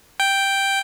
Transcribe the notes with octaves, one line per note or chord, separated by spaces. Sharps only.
G5